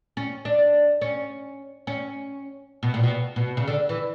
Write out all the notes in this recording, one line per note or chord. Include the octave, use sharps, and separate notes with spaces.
C#4
D4
C#4
C#4
B2
A#2
B2
B2
C#3
D3
E3